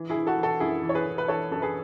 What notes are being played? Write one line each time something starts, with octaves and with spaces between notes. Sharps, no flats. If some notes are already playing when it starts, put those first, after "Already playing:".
Already playing: E3
E4 G#4
E3
F#4 A4
E3
F#4 A4
F#2 E4 G#4
E3
C#5
G#4 B4
E3
B4
E3 A4 C#5
F#2 A4
G#4 B4